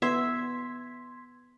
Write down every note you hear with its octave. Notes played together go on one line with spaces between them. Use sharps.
B3 E5 C6 G#6 B6